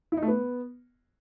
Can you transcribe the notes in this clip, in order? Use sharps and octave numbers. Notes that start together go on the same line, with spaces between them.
E4
D#4
A3
B3